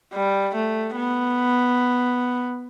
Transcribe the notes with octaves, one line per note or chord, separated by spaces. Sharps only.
G3
A3
B3